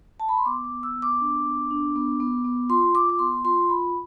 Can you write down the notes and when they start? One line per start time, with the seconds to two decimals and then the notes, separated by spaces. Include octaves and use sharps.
0.20 A5
0.29 B5
0.37 C6
0.46 B3 D6
0.64 D6
0.71 B3
0.83 E6
0.96 B3
1.02 D6
1.21 D4
1.46 B3
1.71 D4
1.96 B3
2.20 B3
2.45 B3
2.69 F4 C6
2.94 F4 D6
3.09 D6
3.19 B3 C6
3.44 F4 C6
3.70 F4 B5